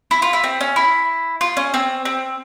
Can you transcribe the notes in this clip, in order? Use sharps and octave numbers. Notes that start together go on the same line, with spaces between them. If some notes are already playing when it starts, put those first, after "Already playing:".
E4
F4
E4
C4
C#4
E4
F4
C#4
C4
C4